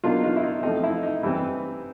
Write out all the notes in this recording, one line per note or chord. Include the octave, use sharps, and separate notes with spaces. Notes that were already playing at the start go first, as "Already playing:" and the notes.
B2 F#3 A#3 D4 D#4 F4
D#4 F4
E4
D#4
F3 A3 C4 D#4
E4
D#4
E3 G3 C4